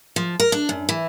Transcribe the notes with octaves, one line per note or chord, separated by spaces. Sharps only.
F3
A#4
D4
F#2
E3